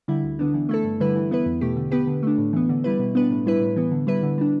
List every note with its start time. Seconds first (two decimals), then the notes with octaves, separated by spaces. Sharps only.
0.08 D3 G3 E4
0.24 D2
0.39 D3 B3 D4
0.54 E3
0.69 A3 E4 A4
0.84 G2
1.00 D3 G3 E4 B4
1.16 E3
1.31 B3 E4 B4
1.46 E2
1.61 B2 A3 G4
1.76 D3
1.91 B3 G4 B4
2.07 D3
2.23 A3 D4
2.38 A2
2.53 E3 B3
2.69 D3
2.84 G3 E4 B4
2.99 B2
3.15 B3 D4 B4
3.30 A2
3.46 G3 E4 B4
3.61 A2
3.76 E3 B3
3.91 D3
4.07 G3 E4 B4
4.23 D3
4.38 G3 D4